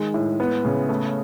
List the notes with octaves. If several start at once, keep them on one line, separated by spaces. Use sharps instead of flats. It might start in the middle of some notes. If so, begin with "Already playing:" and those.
Already playing: D#3 G#3
A2
B3
C#3
A3